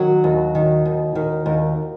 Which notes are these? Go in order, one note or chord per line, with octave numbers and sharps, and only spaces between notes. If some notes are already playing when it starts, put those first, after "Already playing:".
Already playing: D#3 F#3 F#4
D#2
D#3
D#2
D#3
D#2